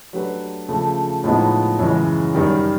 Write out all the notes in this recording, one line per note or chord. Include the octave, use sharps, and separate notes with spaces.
F#3 A3 D4 G4 B4
C#3 F3 A3
A2 F3 G#3 B3 D#4
F#2 C#3 E3 G#3
F#2 D#3 G3